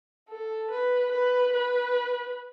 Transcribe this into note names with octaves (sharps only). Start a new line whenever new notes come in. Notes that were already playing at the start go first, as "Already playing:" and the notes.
A4
B4
B4
B4